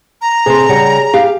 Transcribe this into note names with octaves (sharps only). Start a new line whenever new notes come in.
A#5
C3 G#4 A4 C5
C#3 G3 F#5
G4 F5